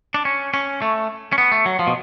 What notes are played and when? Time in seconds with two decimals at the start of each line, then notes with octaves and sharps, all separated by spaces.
0.14 D4
0.25 C#4
0.54 C#4
0.82 A3
1.33 C#4
1.38 B3
1.52 A3
1.66 F#3
1.79 F3
1.87 B2